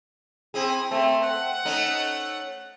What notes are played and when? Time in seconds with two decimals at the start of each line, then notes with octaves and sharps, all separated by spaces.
0.54 C4 E4 G#4
0.91 A3 C4
1.24 F#5
1.65 A3 C#4 D#4